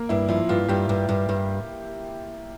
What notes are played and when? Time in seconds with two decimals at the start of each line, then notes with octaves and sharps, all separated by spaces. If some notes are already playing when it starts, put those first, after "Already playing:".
Already playing: A#3
0.09 G2 E4
0.29 F3 E4
0.49 G2 F4
0.69 G2 G4
0.89 G2
1.09 G2
1.29 G2